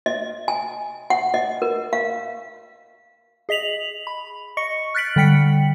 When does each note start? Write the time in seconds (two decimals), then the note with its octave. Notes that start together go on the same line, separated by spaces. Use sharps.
0.06 D#5
0.48 G#5
1.10 F#5
1.34 D#5
1.62 A#4
1.93 F5
3.49 G#4 D#5 B6 F7 F#7
4.07 B5
4.57 D#5 C#6 C#7
4.95 F6 F#6 A6 B6 D7 F#7
5.16 D3 G3 G5 B6 C#7 F#7